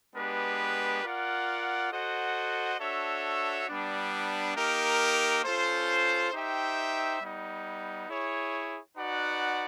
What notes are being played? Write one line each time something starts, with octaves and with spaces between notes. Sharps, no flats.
G#3 B3 D4 G4 B4
F4 A#4 D5 F#5
F#4 A4 C5 D#5 F#5
D4 F#4 A4 C#5 E5
G3 B3 D4
A#3 D#4 G4 A#4
C#4 F4 A4 C5
D#4 G4 C5 E5 G5
G3 B3 D#4
E4 G#4 C#5
D#4 F#4 B4 D5 F#5